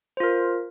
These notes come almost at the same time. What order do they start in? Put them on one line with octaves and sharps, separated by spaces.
C5 F4 A#4